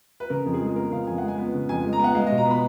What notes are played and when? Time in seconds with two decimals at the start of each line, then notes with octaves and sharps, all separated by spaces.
0.20 B4
0.30 C#3 A#4
0.46 F2
0.54 G#4
0.61 G#3
0.66 G#4
0.76 B3 A#4
0.92 C#3 F5
1.07 F2 G#5
1.18 G#3 F#5
1.28 G#5
1.38 B3
1.54 C#3
1.69 F2 G#5
1.85 G#3
1.93 A#5
2.00 B3 F#5
2.15 G#3 F5
2.27 B2 D#5
2.38 A#5
2.45 B3
2.51 B5